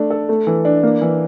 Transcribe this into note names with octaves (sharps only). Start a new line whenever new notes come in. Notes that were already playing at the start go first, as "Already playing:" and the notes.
Already playing: A3 D4
A4
A3
E3
D4
A#3
E3